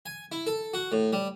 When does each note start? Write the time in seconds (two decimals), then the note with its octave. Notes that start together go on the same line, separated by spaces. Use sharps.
0.06 G#5
0.32 E4
0.47 A4
0.74 F#4
0.92 A2
1.13 G3